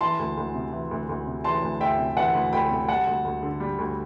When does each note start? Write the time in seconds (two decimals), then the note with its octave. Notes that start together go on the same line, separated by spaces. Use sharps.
0.01 E3 A5 C6
0.19 D2
0.37 D2
0.55 C3
0.73 E3
0.91 D2
1.09 D2
1.27 C3
1.44 E3 A5 C6
1.63 D2
1.80 D2 E5 G5
1.99 C3
2.17 E3 F#5 A5
2.35 D2
2.53 D2 G5 B5
2.71 C3
2.88 G3 F#5 A5
3.07 D2
3.25 D2
3.43 D3
3.60 G3
3.78 D2